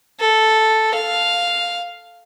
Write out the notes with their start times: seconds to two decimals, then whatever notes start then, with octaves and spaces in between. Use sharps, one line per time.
0.20 A4
0.94 F5